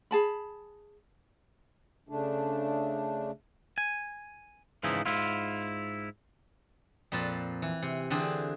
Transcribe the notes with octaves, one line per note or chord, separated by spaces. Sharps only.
G#4 A5 B5
C#3 A3 D4
G#5
G#2 C#3 E3 F3 D#4 E4
G#2 E4 F4
F2 A#2 F3 B4 A5
E3
C3
D3 E3 C4 D4 G4 G#4